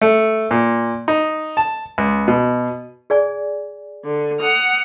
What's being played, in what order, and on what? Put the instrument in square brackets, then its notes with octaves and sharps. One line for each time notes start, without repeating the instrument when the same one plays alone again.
[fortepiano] A3
A#2
D#4
A5
C#2
B2
[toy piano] G#4 D5 G#5
[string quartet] D3
F#5 D#6 F6